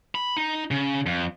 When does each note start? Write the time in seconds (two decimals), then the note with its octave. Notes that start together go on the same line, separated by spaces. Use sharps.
0.15 B5
0.37 D#4
0.71 C#3
1.06 F2